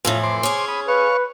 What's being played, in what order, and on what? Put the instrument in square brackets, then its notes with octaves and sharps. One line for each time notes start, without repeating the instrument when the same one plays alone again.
[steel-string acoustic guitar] F2 A2 E3 [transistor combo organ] F4
[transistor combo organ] C5 C6 D6
[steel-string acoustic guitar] C#4 G#4
[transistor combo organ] B5 D#6
[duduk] B4 [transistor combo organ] C#5 F5 C#6